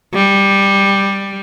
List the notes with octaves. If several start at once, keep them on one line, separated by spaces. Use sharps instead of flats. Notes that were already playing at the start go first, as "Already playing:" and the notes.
G3